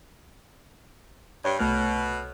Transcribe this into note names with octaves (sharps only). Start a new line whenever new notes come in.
G2 C#5
C2 B2 A3 F6